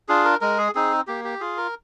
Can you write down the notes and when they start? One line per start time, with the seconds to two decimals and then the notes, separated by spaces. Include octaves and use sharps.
0.09 D4 F4 G#4
0.24 A#4
0.41 G#3 A#4
0.58 G#4
0.75 C4 D#4 G#4
1.07 A#3 G4
1.24 G4
1.40 F4 G#4
1.57 A#4